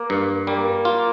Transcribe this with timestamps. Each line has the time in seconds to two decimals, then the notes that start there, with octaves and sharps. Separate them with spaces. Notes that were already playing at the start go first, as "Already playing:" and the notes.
Already playing: A#3
0.10 G2
0.47 G3 A#3
0.85 F4